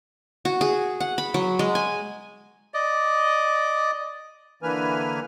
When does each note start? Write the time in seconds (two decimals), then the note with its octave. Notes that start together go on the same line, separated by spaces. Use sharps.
0.45 F#4
0.61 G#4
1.00 F#5
1.18 B5
1.34 F#3
1.59 G#3
1.75 G#5
2.74 D5 D#5
4.63 D3 E3 A#3 B4 G#5 F6